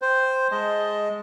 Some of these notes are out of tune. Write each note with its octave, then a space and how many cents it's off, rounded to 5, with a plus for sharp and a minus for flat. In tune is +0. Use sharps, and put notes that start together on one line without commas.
C5 +0 G5 +0
G#3 +0 D#5 +10 A5 +0